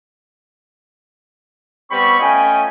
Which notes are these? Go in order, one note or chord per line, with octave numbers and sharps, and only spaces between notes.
G3 B3 C4 B5 C#6
A3 C#4 F4 D#5 G5 G#5